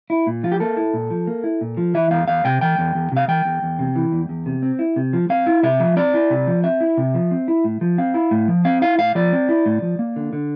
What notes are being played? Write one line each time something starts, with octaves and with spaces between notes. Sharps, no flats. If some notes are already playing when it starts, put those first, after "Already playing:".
E4
A#2
F3 F4
G4
A#3 A4
E4
A#2
F3
A#3
E4
A#2
F3
E3 E5
E2 F5
E2 F5
C3 G5
E3 G5
E2
E2
C3 F5
E3 G5
E2
E2
C3
E3
E2
E2
C3
C4
E4
C3
F3
C4 F5
E4
C3 E5
F3
C4 D5
E4
C3
F3
C4 E5
E4
C3
F3
C4
E4
A2
F3
C4 F5
E4
A2
F3
C4 F5
E4 F5
A2 F5
F3 D5
C4
E4
A2
F3
A#3
D3
D3